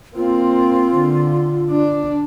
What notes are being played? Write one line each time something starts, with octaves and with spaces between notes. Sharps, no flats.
A#3 C4 F4
D3
D4